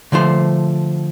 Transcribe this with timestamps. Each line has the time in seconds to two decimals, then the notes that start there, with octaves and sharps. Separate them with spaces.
0.12 D3 F3 A3 C5